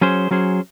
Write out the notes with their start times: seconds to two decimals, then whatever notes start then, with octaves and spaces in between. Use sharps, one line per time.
0.01 F#3 C#4 G#4 C5
0.31 F#3 C#4 G#4 C5